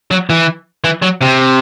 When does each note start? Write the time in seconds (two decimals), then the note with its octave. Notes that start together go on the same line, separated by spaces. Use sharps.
0.11 F#3
0.30 E3
0.84 E3
1.02 F#3
1.21 C3